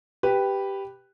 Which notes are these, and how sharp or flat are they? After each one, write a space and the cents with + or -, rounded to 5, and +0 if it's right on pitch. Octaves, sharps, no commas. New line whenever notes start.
G4 +0 B4 +0